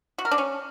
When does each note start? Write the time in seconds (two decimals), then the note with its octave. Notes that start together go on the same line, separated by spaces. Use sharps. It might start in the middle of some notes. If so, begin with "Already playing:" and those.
0.18 F#4
0.25 A#4
0.31 D4
0.38 C#4